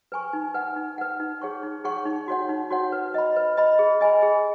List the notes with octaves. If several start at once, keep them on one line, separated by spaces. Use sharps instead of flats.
B4 G#5 C#6
D#4
B4 F#5
D#4
B4 F#5
D#4
G#4 C#5 F#5 C#6
D#4
G#4 C#5 F#5 C#6
D#4
F#4 C#5 F#5
D#4
F#4 C#5 F#5
B4
D#5 B5
B4
D#5 B5
G#4
D#5 G#5 B5
G#4